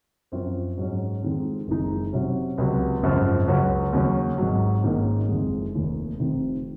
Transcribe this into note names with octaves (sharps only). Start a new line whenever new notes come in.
F#2 F3 C4 F4 C5
G#2 F#3 C#4
F2 D#3 G#3
F#1 F2 D#3 G#3 D#4
C3 F#3 C#4
C#2 C3 F#3 C4
G#1 F#2 C#3 F3
C#2 C#3 F#3 C#4 F#4
D#2 C#3 F#3 C#4
G#1 G#2 F#3
G#1 G#2 D#3 A#3 C#4
F#1 F2 D#3 G#3
F1 D#2 D#3
F1 F2 C3 D#3